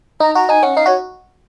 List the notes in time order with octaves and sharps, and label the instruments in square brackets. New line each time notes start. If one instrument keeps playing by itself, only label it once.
[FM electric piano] D#4 [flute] A#5
[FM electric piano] F#4 [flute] A#5
[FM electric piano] D#4 [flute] G#5
[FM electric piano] C#4 [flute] F#5
[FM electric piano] D#4 [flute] F5
[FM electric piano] F#4 [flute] C#5